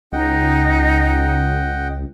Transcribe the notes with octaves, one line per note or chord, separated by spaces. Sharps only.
C#2 D#4 D#5 F#5 G5